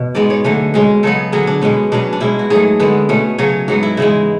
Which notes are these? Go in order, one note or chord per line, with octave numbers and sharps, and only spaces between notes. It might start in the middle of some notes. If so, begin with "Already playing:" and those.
Already playing: B2
G#2 G#3 B3 D5
C#5
D3 F#3 A3 C#4
B2 G#3 C#4
C#3 F#3 B3 A4
D3 F#3 C#4 G#4
D4
B2 G#3 B3 C#4
B2 F#3 C#4 D4
D4
B2 G#3 C#4 E4
F#4
G#2 F#3 A3 G#4
D3 G#3 B3 B4
B2 A3 C#4
C#3 F#3 C#4 C#5
G#2 F#3 B3 F#4
E4
C#3 E3 G#3 E4